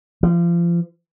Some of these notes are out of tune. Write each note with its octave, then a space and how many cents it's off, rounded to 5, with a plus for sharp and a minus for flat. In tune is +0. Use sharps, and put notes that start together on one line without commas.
F3 -30